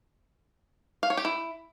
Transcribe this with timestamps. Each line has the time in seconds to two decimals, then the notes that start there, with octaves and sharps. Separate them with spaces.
1.03 F5
1.10 C#5
1.17 G4
1.25 E4